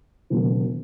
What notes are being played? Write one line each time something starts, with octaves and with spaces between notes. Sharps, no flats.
E1 D#2 C#3 F#3 A3